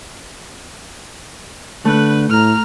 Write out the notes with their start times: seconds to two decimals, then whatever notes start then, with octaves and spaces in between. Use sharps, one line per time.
1.85 D3 A3 B4 F#6
2.30 A2 A#5 F6